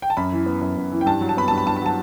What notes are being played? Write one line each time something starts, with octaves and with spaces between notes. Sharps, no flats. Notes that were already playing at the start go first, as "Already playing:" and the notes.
G5
A5
F#2 B5
E3
B3
F#2
F#2
E3
G5
G2 A5
F#3
A5
B3 B5
G2 A5
B5
G2 A5
B5
F#3 A5